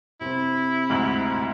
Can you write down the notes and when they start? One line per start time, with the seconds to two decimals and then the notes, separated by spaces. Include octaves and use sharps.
0.21 C3 C4 E4
0.90 D2 G#2 F#7